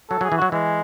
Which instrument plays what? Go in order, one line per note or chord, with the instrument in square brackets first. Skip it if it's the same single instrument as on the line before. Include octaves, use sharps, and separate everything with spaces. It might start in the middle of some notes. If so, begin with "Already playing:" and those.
[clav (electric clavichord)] F#3 [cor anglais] A4
[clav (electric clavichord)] F#3
[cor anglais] G#4
[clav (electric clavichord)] E3
[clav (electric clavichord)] F#3 [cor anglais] F#4
[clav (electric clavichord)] E3 [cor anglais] G#3